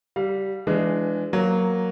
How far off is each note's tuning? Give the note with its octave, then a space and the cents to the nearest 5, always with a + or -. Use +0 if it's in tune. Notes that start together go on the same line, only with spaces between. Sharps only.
G3 -15 F5 +20
E3 +25 G#3 -5 D4 -5
F#3 +0 A#3 +0